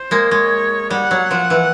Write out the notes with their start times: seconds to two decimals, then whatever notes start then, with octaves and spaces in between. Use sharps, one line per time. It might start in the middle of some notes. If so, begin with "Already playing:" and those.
Already playing: C5
0.11 G#3 A#3
0.31 G#3 C#5
0.91 G3 F#5
1.11 F#3
1.31 F3
1.50 E3